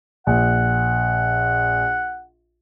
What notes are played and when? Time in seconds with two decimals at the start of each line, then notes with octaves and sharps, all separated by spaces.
0.27 A#1 F#5